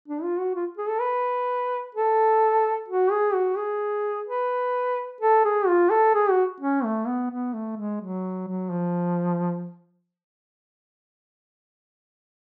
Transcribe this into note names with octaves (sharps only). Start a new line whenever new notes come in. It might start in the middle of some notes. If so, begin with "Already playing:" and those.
D4
F4
F#4
F4
G#4
A4
B4
A4
F#4
G#4
F#4
G#4
B4
A4
G#4
F4
A4
G#4
F#4
C#4
A3
B3
B3
A3
G#3
F#3
F#3
F3